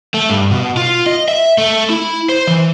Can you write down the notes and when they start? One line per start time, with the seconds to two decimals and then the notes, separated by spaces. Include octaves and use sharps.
0.14 A3
0.30 G2
0.51 B2
0.77 F4
1.06 D#5
1.28 E5
1.58 A3
1.90 E4
2.29 C5
2.47 E3